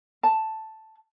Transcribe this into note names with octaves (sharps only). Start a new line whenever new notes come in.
A5